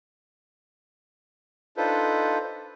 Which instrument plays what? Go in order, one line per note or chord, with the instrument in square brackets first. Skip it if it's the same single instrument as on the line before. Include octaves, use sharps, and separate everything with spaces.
[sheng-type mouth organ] D4 D#4 F4 A4 B4 C5